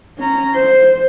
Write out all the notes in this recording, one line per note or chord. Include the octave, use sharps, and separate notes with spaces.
C#4 A#5
C5